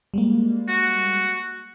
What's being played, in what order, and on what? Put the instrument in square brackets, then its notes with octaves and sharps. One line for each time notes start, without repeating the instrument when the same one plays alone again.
[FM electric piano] G3 G#3 A#3
[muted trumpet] F#4